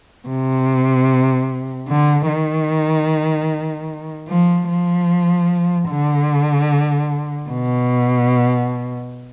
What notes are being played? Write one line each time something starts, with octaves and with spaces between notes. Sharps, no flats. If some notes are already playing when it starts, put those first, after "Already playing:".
C3
D3
D#3
F3
F3
D3
B2